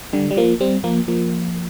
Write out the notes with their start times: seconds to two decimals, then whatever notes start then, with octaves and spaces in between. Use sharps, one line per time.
0.13 D3 G3
0.31 G3
0.37 F3 A#3
0.61 G3 C4
0.84 F3 A#3
1.08 F3 A#3